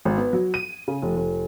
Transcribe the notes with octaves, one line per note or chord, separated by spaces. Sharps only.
G#1
B3
F#3
D#7
C#3
F1
F1